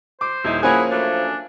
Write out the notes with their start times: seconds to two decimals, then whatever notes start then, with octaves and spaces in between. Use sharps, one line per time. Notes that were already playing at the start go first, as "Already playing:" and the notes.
0.21 C5 D6
0.44 D#1 D#3 D#4 E4
0.63 F3 A#3 C#4 E4 G#4 F#5 G#5
0.90 F#2 A3 D4